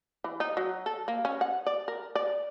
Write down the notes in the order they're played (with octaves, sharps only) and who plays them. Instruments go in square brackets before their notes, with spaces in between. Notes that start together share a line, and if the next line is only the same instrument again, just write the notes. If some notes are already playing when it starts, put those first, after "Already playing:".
[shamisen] E3
D#4
F#3
A4
A#3
C#4
F#5
D5
A#4
D5